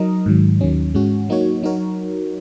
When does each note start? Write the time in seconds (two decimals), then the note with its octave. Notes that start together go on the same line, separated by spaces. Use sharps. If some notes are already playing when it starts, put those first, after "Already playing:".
Already playing: F#3 D#4 A#4 D#5
0.26 G#2 D#3 F#3
0.61 D#2 D#3 F#3 C#4
0.94 G#2 G#3 C#4 F#4
1.29 F#3 A#3 D#4 F#4 C#5
1.63 F#3 D#4 F#4 A#4 C#5